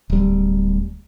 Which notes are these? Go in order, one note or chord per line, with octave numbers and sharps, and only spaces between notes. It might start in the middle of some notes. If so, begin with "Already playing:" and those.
D1 G3